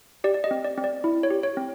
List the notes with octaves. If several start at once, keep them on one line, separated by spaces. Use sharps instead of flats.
G4 D5
D5
D#5
C4
D5
C4
D5
E4
C#5
G4
C#5
C4